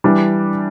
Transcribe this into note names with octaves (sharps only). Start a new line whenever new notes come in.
E3 G3 D4